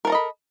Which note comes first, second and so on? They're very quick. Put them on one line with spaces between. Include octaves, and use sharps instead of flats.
A#4 A4 A#5 D#5 B5